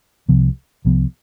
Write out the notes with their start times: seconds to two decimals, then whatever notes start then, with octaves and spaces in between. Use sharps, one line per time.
0.28 C2 C3 F3 B3
0.85 C2 C3 F3 B3